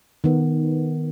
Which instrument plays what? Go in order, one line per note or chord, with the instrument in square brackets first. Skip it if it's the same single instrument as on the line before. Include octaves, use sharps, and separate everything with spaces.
[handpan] D#3 B3